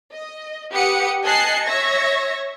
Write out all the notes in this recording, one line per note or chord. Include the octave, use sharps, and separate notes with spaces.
D#5
G4 B4 F#5 D#6 C#7
D#5 G#5 A5 F#6 C7 C#7
C#5 E5 C#6 G#6 A#6